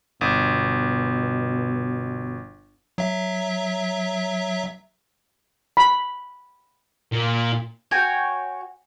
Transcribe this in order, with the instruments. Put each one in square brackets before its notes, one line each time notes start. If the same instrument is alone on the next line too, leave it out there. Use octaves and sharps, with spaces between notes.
[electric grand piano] G1 [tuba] B2
[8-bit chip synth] F#3 E5
[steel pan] B5
[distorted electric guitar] A#2
[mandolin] F#4 C#5 G5 G#5